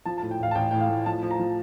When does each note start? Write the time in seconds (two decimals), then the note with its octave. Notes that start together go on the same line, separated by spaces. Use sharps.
0.06 F3 A5
0.18 A5
0.23 A2
0.31 G5
0.39 A1 F5
0.51 A5
0.55 A1 G5
0.71 A2 G5
0.81 F5
0.90 A2
1.06 F3 A5
1.23 F3
1.31 A#5
1.40 F3